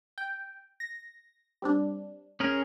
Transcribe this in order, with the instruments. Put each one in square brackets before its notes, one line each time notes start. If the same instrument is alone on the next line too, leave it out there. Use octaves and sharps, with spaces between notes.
[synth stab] G5
A#6
G3 C4 D4
[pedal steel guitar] C#4 G#4 A#4